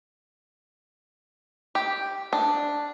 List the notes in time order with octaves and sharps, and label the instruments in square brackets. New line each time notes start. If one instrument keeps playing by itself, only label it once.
[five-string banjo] G4
D4